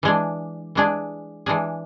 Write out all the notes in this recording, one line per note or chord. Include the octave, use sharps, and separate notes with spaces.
E3 G#3 D4 G#4
E3 G#3 D4 G#4
E3 G#3 D4 G#4